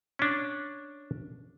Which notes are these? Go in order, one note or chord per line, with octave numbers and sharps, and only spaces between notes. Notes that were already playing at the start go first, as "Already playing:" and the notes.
C#4 D4